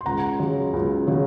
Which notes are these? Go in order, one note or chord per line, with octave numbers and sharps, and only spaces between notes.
C6
C#2 F#5 A#5
C#3 F#3
C#2
C#3 F#3